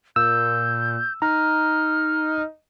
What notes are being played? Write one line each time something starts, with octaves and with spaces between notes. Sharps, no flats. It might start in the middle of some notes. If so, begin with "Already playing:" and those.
A#2 E6 G6
D#4 A#5 F6